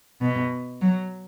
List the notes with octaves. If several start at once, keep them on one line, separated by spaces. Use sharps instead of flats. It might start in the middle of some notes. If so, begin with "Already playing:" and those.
B2
F#3